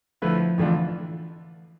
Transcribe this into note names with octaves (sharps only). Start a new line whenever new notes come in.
D3 F3 A3 E4 B4
F2 D3 E3 A3 D4 F4